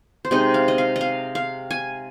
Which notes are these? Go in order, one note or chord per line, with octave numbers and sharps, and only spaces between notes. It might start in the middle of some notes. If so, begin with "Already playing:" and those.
C5
C3 G#3 D#4 D#5
F5
D#5
F5
D#5
F5
F5
G#5